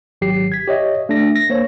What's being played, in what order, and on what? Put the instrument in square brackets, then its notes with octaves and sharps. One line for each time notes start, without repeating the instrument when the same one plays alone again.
[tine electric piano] G#1 F#3 G4 C7
G#6 B6
G4 C#5 D#5 E5
A3 D4 A#6
A#6
A#3 C5 C#5